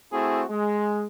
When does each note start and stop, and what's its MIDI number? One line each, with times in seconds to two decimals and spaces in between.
0.12 0.43 57
0.12 0.43 60
0.12 0.43 64
0.12 0.43 66
0.12 0.43 68
0.50 1.06 56